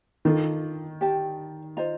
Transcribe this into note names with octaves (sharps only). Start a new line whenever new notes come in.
D#3 D4 F4 A4
G4 D5 A5
F4 C5 D#5 A#5